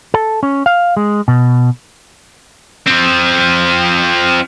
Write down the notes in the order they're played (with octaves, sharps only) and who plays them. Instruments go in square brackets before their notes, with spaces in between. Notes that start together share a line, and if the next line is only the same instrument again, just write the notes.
[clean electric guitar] A4
C#4
F5
G#3
B2
[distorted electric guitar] F3 C4